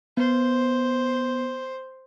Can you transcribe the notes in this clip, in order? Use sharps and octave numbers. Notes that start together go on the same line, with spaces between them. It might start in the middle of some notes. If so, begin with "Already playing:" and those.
B3 C5